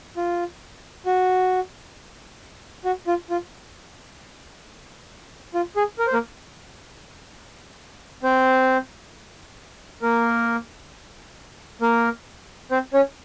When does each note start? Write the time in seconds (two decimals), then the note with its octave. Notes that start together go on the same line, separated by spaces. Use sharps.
0.17 F4
1.06 F#4
2.85 F#4
3.07 F4
3.30 F4
5.54 F4
5.76 G#4
5.99 A#4
6.07 C5
6.13 A#3 A#4
8.23 C4 C5
10.02 A#3 A#4
11.81 A#3 A#4
12.71 C4 C5
12.94 C#4 C#5